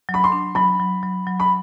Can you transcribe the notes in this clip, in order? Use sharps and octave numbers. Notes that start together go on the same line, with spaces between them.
F#3
B5
C6
D4
F#3 B5
F#3
F#3
F#3
B5